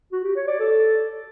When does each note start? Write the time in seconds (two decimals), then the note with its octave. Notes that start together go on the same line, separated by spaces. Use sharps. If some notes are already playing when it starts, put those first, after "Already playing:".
0.12 F#4
0.24 G4
0.36 C#5
0.48 D5
0.59 A4